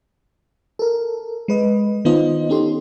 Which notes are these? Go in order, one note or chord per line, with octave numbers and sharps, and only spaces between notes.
A4 A#4
G#3 B4 D#5
D#3 B3 D#4 F4 C5 D#5
C#4 D#4 G4 A4 C6